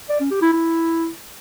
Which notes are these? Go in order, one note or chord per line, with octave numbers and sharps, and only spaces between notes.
D5
C#4
G4
E4
E4